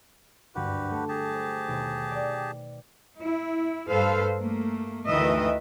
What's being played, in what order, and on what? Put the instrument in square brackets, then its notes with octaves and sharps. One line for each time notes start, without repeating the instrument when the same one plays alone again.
[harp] F#1 D2 G2 [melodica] F#4 G4 B4
[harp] A3 C#6 G6
[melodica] G4 G#4 A5
[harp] C5
D#2 B2
D5 G5
[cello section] E4
G2 A4 B4 C5 F5
A3 A#3
D2 D#3 E3 B4 D#5 E5